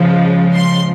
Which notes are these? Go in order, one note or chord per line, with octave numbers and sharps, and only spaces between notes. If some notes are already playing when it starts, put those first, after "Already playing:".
Already playing: C#3 F3 G#3
C6